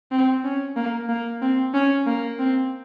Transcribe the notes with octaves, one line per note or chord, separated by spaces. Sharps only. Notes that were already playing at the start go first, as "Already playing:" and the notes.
C4
C#4
A#3
A#3
C4
C#4
A#3
C4